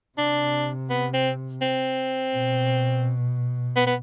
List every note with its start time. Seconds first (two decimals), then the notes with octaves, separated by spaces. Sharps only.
0.18 C3 D4
0.90 B3
1.13 C4
1.62 C4
2.33 B2
3.76 B3
3.87 B3